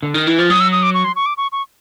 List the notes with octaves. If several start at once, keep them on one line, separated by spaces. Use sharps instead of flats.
D3
D#3
E3
F3
F#3 D#6
E6
D#6
D6
C#6
C6
C#6
D6
C#6
C#6